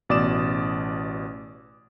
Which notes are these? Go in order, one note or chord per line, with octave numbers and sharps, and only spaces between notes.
A1 B2 D5 D6 D#6 E7